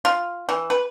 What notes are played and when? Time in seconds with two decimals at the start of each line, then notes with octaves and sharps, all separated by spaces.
0.05 F4
0.49 E3
0.70 B4